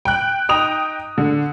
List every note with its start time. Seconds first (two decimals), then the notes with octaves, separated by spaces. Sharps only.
0.05 G5 F#6
0.49 D#4 G5 D#6 F7
1.18 D3